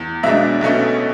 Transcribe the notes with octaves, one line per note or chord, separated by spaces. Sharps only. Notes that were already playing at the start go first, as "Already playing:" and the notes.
Already playing: E2
B1 B2 G#3 D4 E5
B1 B2 A3 C#4